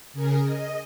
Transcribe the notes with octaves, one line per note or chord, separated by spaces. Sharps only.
C#3 G#4 A#4
D#5